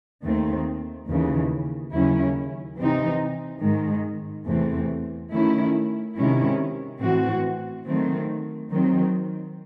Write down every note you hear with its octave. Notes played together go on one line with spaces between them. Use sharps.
D#2 D#3 A3 C4
D#2 C#3 E3
D#2 C#3 F#3 C#4 E4
C3 E3 C4 D#4
G#2 D#3 G#3
E2 C3 E3 A3 C4
D#3 A3 C#4 E4
C3 D#3 G#3 C#4 E4
A2 E3 C4 F#4
D#3 F#3 A3 C4
D#3 F#3 C4